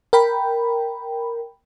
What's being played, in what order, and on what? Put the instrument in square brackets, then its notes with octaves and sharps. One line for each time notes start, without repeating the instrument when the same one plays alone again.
[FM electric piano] A#4 G5 B5